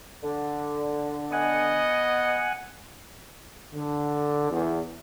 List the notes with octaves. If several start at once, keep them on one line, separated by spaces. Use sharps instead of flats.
D3
B3 D#5 F#5 G#5
D3
E2